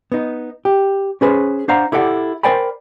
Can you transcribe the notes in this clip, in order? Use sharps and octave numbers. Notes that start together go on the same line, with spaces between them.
B3 D#4
G4
C#4 G#4 B4 C5
D4 C5 F5 F#5 A#5
E4 G4 A4 D5 F#5
A#4 C5 D5 G5 G#5 B5